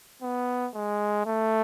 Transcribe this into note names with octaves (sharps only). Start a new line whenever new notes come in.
B3
G#3
A3